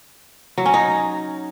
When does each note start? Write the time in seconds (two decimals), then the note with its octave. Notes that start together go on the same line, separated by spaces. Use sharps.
0.58 F#3
0.66 C#4
0.74 D#4